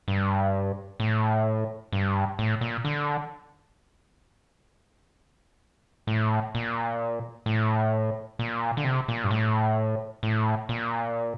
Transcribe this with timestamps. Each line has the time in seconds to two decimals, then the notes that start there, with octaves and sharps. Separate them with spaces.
0.08 G2
1.00 A2
1.93 G2
2.39 A2
2.61 A#2
2.85 D3
6.07 A2
6.55 A#2
7.46 A2
8.39 A#2
8.77 D3
8.84 C3
9.08 A#2
9.24 G2
9.31 A2
10.23 A2
10.69 A#2